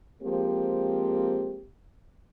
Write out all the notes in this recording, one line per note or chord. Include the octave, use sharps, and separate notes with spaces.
F3 G#3 A#3 C4 G4